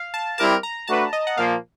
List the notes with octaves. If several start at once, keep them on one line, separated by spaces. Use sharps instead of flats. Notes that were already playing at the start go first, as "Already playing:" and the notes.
Already playing: F5
A5
G3 C4 E4 G4 A#4 A5
A#5
A3 D4 F#4 B4 A5
D#5
F#5
A#2 F3 A#3 F5